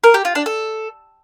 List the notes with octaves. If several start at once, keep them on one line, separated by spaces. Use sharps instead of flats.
A#4
G4
F4
D4
A4